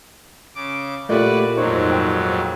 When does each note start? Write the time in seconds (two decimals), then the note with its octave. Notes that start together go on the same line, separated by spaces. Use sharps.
0.56 C#3 D6
1.09 A#2 A3 F#4 G4 B4 D5 G5
1.57 F2 G#2 F#3 D#4 C5 C#5
1.92 G5